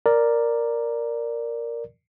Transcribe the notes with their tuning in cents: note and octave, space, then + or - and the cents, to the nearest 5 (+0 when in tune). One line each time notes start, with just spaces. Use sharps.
A#4 +0 D5 +0